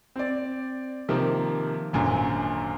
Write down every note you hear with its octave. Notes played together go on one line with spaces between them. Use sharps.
C4 D5
C3 D#3 F3 A#3
G#1 F#2 A#2 D3